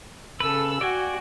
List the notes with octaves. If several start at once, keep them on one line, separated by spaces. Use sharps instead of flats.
C#3 A4 B4 E6
F#4 D5 G5 G#5